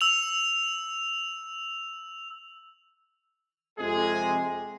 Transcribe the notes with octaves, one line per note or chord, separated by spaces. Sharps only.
E6 F7
F2 C3 G#3 G#4